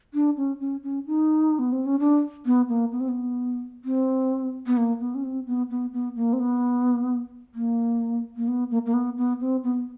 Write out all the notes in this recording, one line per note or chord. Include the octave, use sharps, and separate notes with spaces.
D4
C#4
C#4
C#4
D#4
B3
C4
C#4
D4
B3
A#3
B3
C4
B3
C4
B3
A#3
B3
C#4
C4
B3
B3
B3
A#3
C4
B3
A#3
A#3
B3
A#3
A#3
B3
B3
C4
B3